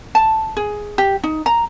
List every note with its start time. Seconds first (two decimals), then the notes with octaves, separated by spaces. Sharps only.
0.15 A5
0.57 G#4
0.98 G4
1.23 D#4
1.46 A#5